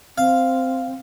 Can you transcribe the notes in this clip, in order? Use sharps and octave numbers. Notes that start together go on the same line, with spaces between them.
C4 F5